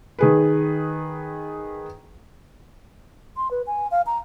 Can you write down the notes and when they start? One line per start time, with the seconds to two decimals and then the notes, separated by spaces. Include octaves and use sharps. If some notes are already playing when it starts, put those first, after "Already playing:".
0.19 D#3 G#4 B4
3.37 C6
3.51 B4
3.67 G#5
3.91 F5
4.06 A#5